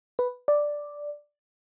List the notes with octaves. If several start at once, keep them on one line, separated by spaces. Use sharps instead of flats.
B4
D5